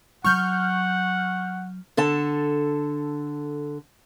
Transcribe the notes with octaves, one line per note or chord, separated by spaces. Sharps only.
F#3 F#5 C#6 F6 G6
D3 A4 A5